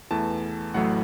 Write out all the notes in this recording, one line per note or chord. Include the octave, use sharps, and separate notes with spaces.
E2 E3 A3 A5
A1 A2 F#3 A3 F#5